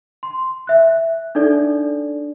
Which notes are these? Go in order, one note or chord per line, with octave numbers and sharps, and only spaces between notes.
C6
E5 F#6
D4 D#4 A4 D5